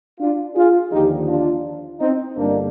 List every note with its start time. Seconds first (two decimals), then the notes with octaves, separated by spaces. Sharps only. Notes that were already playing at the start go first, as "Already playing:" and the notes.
0.19 D4 F4
0.55 F4 G#4
0.91 D#2 D3 F3 D#4 G4
1.28 D4 F4
2.00 C4 D#4
2.36 G1 G2 D3 G3 A#3 D4